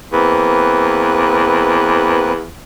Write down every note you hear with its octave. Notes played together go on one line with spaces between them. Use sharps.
E2 A#3 C4 B4